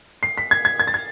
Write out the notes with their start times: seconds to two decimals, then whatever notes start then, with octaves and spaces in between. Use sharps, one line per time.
0.23 C7
0.38 B6
0.51 G#6
0.65 G#6
0.80 G#6
0.87 A6
0.94 G#6